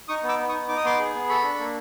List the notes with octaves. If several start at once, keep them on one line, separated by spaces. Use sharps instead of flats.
D#4 C#6 D#6
B3
D6 E6
B3
C#6 D#6
D#4
D#4 D6
D#6
B3 C6 D6
G#4
B3
A4 B5 C#6
D4
A#3